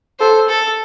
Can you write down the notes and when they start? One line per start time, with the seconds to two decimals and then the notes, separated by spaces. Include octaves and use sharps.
0.20 A4 C5
0.49 A4